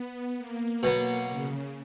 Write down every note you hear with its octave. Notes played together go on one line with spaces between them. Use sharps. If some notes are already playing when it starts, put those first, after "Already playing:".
Already playing: B3
A#3
B2 F#3 A#3 B3
C#3